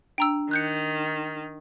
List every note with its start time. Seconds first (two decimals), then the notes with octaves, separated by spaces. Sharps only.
0.18 D4 G5 A#5 E6
0.51 D#3 F#6 G6 C#7